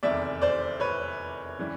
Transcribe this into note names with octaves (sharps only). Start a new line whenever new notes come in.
F1 E2 C3 D#3 D5 E5
C5 D5
B4 C#5
C#3 E3 G3